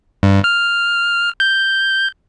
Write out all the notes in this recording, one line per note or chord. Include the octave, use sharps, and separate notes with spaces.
G2
F6
G6